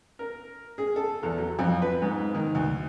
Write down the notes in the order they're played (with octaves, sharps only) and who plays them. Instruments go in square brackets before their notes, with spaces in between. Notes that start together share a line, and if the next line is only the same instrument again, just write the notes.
[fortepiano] A#4
G#4
A4
E2
F#3
F2
B4
G#2
D#3
D2